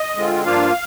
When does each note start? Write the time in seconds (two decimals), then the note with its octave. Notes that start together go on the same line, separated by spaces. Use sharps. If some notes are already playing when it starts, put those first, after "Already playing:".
Already playing: D#5
0.16 D3 G#3 C4 F4
0.45 G2 F3 A#3 D4 F4 F5